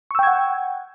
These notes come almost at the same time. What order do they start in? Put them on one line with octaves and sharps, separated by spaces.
C#6 E6 G5 G#6 F#5